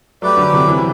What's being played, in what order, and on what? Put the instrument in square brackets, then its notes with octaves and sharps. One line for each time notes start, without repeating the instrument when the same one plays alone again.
[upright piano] F#3 A3 [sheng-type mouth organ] G4 B4 D5
[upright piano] D3 F#3
C3 E3
C3 E3
E3